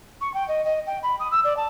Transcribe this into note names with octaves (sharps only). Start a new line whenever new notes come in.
C#6
G5
D#5
D#5
G5
B5
D#6
E6
D5
A5